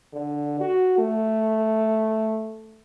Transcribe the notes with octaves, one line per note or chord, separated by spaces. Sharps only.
D3
F#4
A3